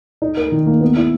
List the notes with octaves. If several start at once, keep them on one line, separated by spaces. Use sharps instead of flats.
D#4
A#4
D#3
A#3
B3
E4